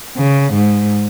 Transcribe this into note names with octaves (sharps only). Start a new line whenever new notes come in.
C#3
G#2